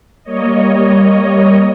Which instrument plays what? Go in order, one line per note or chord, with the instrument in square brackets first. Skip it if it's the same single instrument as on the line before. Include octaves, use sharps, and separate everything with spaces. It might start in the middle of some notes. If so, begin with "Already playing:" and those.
[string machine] G3 A#3 C#5 D#5